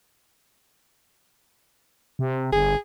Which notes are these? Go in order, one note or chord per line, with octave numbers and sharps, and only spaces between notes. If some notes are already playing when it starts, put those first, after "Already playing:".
C3
G1 G#4